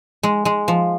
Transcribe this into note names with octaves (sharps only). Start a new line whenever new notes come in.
G#3
G#3
F3